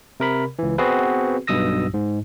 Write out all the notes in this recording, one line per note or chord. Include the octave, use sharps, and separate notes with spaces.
C3 A#4 B5
C#2 E3
B3 C4 F#4 G#4 B4
B1 G2 B2 D#6 E6 A#6
G#2